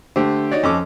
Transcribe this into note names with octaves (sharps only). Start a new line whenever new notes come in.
D3 A3 G4 C5
D#4 F#4 C#5 D5
F2 C#4 A4 D#5 D6